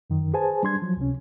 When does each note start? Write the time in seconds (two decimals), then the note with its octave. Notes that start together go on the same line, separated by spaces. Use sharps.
0.10 F#2 D#3
0.34 G#4 B4 C5 G#5 A5
0.63 G3 D4 C6 G#6
0.82 F3 F#3
0.97 C#2 C3 C#4